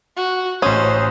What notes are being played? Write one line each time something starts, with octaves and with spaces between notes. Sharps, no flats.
F#4
A1 C#4 C5 D#6